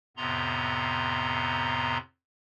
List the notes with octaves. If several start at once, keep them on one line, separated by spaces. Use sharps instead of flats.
F2 A2 C3 B3 A#5 C6